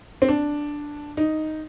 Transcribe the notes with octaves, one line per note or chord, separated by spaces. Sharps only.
C4
D4
D#4